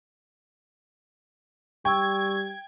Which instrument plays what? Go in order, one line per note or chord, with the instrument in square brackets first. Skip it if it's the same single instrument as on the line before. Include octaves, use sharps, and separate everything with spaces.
[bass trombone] G3 [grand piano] G5 [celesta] C#6 E6 [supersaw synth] G#6